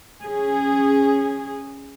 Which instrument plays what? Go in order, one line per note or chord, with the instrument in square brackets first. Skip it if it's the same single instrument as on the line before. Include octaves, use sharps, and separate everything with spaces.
[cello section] C#4 G#4